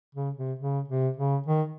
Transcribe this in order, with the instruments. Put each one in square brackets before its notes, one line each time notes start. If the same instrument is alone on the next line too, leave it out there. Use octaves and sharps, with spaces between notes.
[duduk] C#3
C3
C#3
C3
C#3
D#3